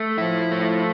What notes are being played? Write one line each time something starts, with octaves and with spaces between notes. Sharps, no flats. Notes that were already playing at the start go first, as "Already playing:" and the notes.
Already playing: A3
F3 E4
A3